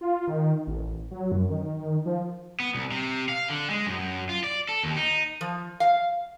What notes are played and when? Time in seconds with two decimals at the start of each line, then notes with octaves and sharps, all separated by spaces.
0.01 F4
0.28 D#3
0.67 A1
1.11 F#3
1.32 F#2
1.50 D#3
2.06 F3
2.60 B3
2.75 C2
2.91 C3
3.29 F5
3.50 D3
3.70 G#3
3.87 F#2
4.29 F4
4.44 D5
4.69 A4
4.83 D#2
4.97 D#4
5.41 F3
5.80 F5